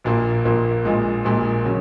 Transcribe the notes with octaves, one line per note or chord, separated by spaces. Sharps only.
A#1 A#2 A#3
A#1 A#2 A#3
A#1 A#2 G#3
A#1 A#2 G#3
C#3 F#3